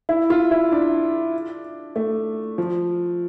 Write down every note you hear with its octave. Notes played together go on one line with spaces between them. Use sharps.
E4
F4
E4
D4
A3
F3